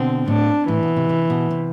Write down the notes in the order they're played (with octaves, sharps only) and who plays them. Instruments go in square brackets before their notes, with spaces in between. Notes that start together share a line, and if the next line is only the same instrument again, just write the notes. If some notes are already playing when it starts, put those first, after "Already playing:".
Already playing: [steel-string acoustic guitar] B2 D3 [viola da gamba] C4
[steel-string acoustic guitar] A2 [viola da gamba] D4
[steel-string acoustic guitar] A2 [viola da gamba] E3
[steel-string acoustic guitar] B2
C3
C3
B2
C3